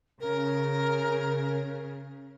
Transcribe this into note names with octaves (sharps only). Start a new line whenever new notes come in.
C#3 A#4